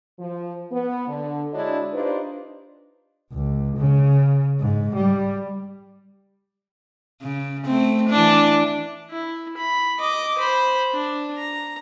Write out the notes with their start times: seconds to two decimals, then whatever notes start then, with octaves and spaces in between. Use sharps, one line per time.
0.20 F3
0.72 B3
1.08 D3
1.53 G#3 D4 E4 F#4 C#5 D#5
1.93 D4 D#4 F4 G4 B4 C5
3.33 C#2
3.76 C#3
4.59 G#2
4.95 G3
7.22 C#3
7.66 A3 C4
8.10 E3 D4
9.11 E4
9.57 B5
9.99 D#5 D6
10.38 C5 B5
10.93 D4
11.38 A#5